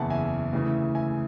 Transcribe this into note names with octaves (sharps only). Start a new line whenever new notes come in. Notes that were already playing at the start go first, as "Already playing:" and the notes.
Already playing: F#1 E2 C#3 E5 F#5 G#5 A5
E5 G#5
D2 C#3 E3
E5 G#5